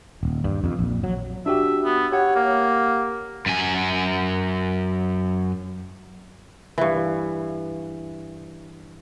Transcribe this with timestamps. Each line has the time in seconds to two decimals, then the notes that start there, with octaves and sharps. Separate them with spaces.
0.23 D#1
0.44 G2
0.64 F2
0.79 A#1
1.04 F#3
1.46 D4 F#4 G4 E5
1.85 B3
2.12 G4 C#5 F#5
2.36 A#3
3.46 F#2 G#5
6.78 G2 E3